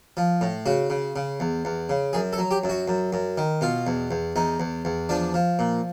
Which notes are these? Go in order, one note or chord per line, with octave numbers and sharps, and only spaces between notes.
F3
A2
C#3 F#4
C#3
C#3
E2
E2
C#3
F#2 G#4
A4
F#3
G4
F#2
F#4
F#2
F#2
D#3
B2 F4
E2
E2
E2 D#4
E2
E2
F3 D4
F3
A#2